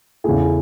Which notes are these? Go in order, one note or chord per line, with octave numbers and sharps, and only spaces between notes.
E2 C#3 E3 A3 E4 G#4